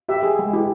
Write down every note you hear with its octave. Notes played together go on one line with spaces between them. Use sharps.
G4 E5
G#4
G#3
E4 G4